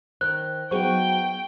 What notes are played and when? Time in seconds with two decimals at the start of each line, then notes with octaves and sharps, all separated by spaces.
0.21 D#3 C5 F#6
0.71 F#3 B3 D#4 G#4 C5 G5 C#6